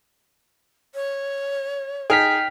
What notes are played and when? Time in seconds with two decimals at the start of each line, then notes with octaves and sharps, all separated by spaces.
0.95 C#5
2.10 D#4 G#4 G5 F6 B6